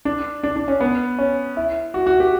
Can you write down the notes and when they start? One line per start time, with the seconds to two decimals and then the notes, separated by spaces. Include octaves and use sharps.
0.05 D4
0.43 D4
0.56 D4
0.68 C#4
0.80 B3
1.18 C#4
1.57 E4
1.94 F#4
2.07 F#4
2.20 G4